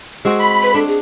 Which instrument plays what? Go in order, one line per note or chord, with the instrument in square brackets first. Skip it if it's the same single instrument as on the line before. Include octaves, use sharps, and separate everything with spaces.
[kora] G#3 C4 F#4
[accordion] B5
[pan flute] B4
[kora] D4 [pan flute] A4
[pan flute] G#4